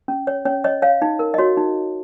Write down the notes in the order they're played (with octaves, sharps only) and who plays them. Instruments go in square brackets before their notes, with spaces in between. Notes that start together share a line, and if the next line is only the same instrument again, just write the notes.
[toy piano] C#4
C#5
C#4 C#5
C#5 D#5
C#5 F5
D#4
A#4
D#5
F#4 C#5
D#4